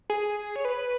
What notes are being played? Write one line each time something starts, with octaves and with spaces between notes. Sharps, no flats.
G#4
C#5
B4